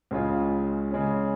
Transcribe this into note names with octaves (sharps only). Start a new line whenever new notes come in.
C#2 C#3 G#3 C#4 F4
C#3 G#3 C#4